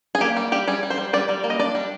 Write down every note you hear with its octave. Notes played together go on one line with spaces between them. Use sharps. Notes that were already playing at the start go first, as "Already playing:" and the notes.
G#4
A#3 G4
G3
G3 G4
G3 G#4
G3
C5
G3
G3 D5
G3
A#3
D#5
D4 D5
G3